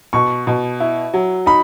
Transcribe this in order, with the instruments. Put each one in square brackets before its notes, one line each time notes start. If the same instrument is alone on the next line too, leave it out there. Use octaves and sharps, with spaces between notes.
[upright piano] B2 [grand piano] C#6
[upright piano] B2
E4
F#3
[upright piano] D#4 [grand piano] B5